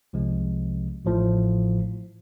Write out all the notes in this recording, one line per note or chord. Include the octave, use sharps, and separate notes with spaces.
C2 C3 F3 G#3
A1 A2 F3